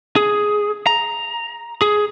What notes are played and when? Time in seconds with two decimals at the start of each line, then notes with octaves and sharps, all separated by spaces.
0.16 G#4
0.87 A#5
1.82 G#4